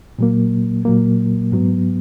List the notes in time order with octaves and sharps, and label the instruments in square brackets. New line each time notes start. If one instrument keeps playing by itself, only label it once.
[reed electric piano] A#2 F#3 A#3
A#2 F#3 A#3
G#2 F#3 B3